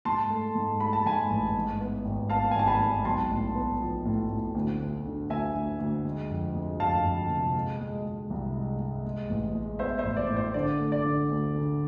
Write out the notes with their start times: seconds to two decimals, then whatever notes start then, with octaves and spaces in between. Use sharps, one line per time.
0.05 G#2 A5 C6
0.30 A3
0.55 G#2
0.80 A3 B5
0.93 A5
1.06 G#2 G#5 B5
1.30 A1
1.55 G#2
1.80 B3
2.05 G#1
2.30 B3 F5 A5
2.51 G#5
2.55 G#1 A5
2.67 G#5 B5
2.80 G#2
3.05 B1 A5 C6
3.29 A2
3.55 B3
3.80 F3
4.05 A2
4.29 A2
4.55 D2
4.79 D2
5.05 D3
5.30 D2 E5 G#5
5.55 D2
5.79 D2
6.05 G#3
6.30 F2
6.55 G#3
6.80 F2 F5 A5
7.04 F2
7.30 C3
7.55 G#3
7.80 G#3
8.05 G#3
8.30 C2
8.55 G#3
8.80 G#3
9.05 G#3
9.29 A1
9.55 G#3
9.79 B3 C5 E5
9.98 C5 E5
10.05 A1
10.17 D5
10.29 A2
10.36 C5
10.54 D3 D5
10.79 A3
10.92 D5
11.05 D3
11.30 D2
11.54 D3